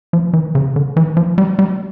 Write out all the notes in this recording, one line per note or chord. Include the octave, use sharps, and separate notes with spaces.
F3
E3
C#3
D3
E3
F3
G3
G3